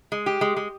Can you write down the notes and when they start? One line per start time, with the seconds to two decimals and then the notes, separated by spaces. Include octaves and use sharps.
0.12 G#3
0.26 G4
0.41 G#3
0.57 G#3